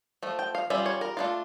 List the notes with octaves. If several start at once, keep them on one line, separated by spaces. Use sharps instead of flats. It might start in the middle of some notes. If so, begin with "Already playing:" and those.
F3 A3
G5
F5
G3 C#4 F4 E5
C#5
A#4
A3 D4 F4